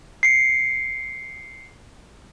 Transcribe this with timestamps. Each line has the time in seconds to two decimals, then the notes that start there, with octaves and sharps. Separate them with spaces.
0.23 C7 C#7